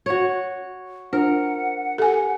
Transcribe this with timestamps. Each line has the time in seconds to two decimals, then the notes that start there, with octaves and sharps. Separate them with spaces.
0.06 F#4 C#5
1.13 D4 F4 A#4 C5 F#5
1.98 G4 A4 G#5